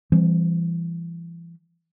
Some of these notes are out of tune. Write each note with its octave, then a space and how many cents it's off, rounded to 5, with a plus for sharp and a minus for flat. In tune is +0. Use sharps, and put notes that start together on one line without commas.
E3 +40 G3 +25 C4 +0